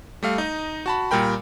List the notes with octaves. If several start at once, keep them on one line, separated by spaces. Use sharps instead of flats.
G3 A3 F5
D#4 D#5
F#4 A5 B5
A#2 G3 A#4 G5 B5